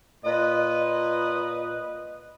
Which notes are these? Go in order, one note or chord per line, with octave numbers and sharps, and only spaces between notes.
A#2 B4 D#5